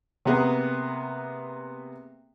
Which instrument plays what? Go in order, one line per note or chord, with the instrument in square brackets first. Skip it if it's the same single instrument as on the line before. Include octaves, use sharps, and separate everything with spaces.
[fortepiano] C3 A#3 B3 G#4